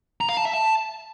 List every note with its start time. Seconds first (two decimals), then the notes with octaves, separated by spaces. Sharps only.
0.21 A#5
0.29 F5
0.37 A5
0.45 E5
0.53 A5